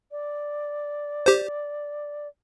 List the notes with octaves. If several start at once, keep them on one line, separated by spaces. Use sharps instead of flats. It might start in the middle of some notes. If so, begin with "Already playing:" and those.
D5
G4 C5